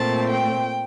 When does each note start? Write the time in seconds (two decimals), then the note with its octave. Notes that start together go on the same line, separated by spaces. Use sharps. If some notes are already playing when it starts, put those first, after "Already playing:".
Already playing: A#2 A3 C4 A5
0.30 G5